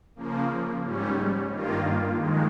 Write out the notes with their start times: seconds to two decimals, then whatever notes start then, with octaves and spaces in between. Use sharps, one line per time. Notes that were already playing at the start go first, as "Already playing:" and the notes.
0.16 C#3 F3 A#3
0.84 G#2 G3 C#4
1.50 G2 D#3 A#3 F4
2.18 F2 D#3 G#3